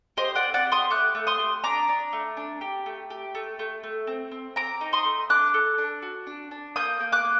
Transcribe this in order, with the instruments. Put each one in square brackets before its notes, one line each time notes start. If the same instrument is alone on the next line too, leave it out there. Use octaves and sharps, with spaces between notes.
[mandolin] G4 C5 D#5
D5 F#5
C4
D5 F#5
G4
C6 D#6
A3 D6 F#6
A3
C6 D#6
G4
D4 A#5 D6
D4
A3
D4
G4
A3
G4
A3
A3
A3
C4
C4
C4 A#5 D6
D#4
C6 D#6
A3
D4 D6 F#6
A4
D4
F#4
D4
D4
A#3 D#6 G6
A#3
D6 F#6
A#3